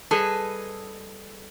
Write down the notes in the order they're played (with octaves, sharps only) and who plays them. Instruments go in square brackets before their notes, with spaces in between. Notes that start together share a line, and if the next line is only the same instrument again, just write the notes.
[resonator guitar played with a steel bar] G3 G#4 A4 B4 D#5